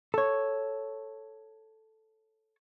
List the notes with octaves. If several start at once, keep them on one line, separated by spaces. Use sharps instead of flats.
A4 C#5